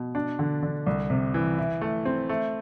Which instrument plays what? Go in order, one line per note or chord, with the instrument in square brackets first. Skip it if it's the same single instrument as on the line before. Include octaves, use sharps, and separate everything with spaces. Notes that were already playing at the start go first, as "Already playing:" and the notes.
Already playing: [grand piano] B2
D4
D3
D3
C2
C3
E3
E4
A3
C4
A3